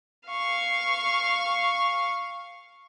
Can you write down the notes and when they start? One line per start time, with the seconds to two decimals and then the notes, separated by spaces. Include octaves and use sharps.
0.29 F5 C#6